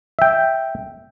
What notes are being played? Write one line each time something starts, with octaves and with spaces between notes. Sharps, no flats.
E5 G5